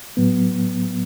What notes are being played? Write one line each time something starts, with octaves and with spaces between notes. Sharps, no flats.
A2 F#3 B3